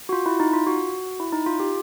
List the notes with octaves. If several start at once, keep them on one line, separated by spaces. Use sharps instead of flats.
F#4
F4
E4
D#4
F4
F#4
E4
D#4
F4
G4